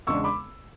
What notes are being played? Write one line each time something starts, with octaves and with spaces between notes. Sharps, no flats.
E2 C#3 G#3 D4 C#6 E6
B5 D6